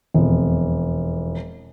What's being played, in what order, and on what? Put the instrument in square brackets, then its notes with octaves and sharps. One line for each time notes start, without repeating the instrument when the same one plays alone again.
[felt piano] E1 F2